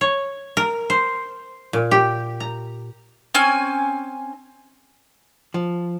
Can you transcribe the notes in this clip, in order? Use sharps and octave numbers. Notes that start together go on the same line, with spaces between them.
C#5
A#4
C5
A#2
G4
A#5
C4 C#4 G#5
F3